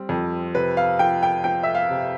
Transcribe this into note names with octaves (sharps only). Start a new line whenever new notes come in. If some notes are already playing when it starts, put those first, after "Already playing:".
Already playing: G3 C4
F2
C3 B4
F5
F3 G5
G5
F3 G5
E5
F5
C3